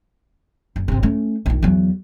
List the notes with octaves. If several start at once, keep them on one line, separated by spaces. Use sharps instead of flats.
F#1
G#1 C3
A3 C#4
A#1 D#3
E2 F#3